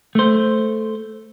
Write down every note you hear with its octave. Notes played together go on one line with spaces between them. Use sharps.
A3 C5